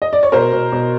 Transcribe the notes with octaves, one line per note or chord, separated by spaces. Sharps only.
D#5
D5
C#5
B2 A#4 C5
B2
B2